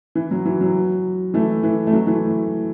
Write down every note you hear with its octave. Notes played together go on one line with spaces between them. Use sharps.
E3
F#3
E3
F#3
E3 A3
E3
A3
F#3
E3 A3